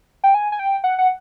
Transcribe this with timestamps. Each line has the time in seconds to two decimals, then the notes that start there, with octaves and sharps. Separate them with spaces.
0.24 G5
0.34 G#5
0.52 G#5
0.59 G5
0.84 F#5
0.99 F#5